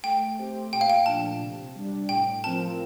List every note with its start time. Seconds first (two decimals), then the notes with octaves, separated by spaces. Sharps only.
0.03 A3 G5
0.39 C4 G4 C5
0.72 A#2 G5
0.81 F5
0.90 G5
1.06 F3 A3 D4 A5
1.41 C3
1.75 G3 D4
2.09 A2 G5
2.43 F3 C4 F4 A#4 A5